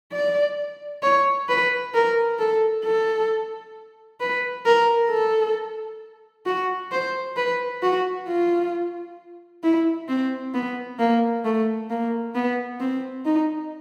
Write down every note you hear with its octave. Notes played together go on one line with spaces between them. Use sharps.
D5
C#5
B4
A#4
A4
A4
B4
A#4
A4
F#4
C5
B4
F#4
F4
E4
C4
B3
A#3
A3
A#3
B3
C4
D#4